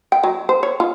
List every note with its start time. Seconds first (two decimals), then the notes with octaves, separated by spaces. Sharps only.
0.12 G5
0.23 F#3
0.49 C5
0.63 C#5
0.80 F4